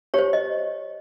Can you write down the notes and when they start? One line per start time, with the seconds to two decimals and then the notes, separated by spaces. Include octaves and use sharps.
0.14 G4 C5 C#5
0.33 D#5